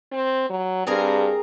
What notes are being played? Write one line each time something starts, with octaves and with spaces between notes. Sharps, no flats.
C4
F#3
G2 C4 G#4 A#4